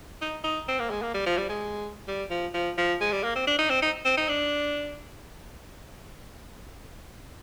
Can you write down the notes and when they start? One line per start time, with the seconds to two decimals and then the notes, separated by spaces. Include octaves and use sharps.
0.22 D#4
0.44 D#4
0.68 C4
0.79 A#3
0.91 G#3
1.02 A#3
1.14 G3
1.26 F3
1.38 G3
1.49 G#3
2.08 G3
2.31 F3
2.54 F3
2.78 F3
3.01 G#3
3.12 G3
3.24 A#3
3.35 C4
3.47 D4
3.59 D#4
3.70 C4
3.82 D#4
4.05 C4
4.17 D#4
4.29 D4